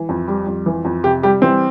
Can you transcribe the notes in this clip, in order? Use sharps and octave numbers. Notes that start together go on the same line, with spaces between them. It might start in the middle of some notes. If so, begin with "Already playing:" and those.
Already playing: E3
F2
G3
F2
E3
F2
C3 G4
G3 G4
E3 C4